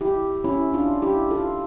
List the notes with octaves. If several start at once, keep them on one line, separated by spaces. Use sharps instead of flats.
E4 G4
C#4 E4
D4 F4
E4 G4
F4 A4